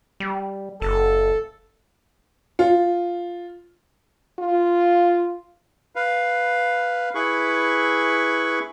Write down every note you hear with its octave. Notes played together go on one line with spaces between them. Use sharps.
G3
F#1 A4
F4
F4
B4 F5
E4 G#4 B4 B5 C#6